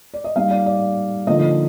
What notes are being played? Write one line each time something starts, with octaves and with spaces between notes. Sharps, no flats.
D5
D#5
G3 A#3 D#4 F5
D5
D5
D3 F3 A#3 D#4 D#5